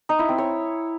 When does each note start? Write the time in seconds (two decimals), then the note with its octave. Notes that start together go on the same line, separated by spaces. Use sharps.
0.09 D#4
0.19 E4
0.29 C4
0.38 C#5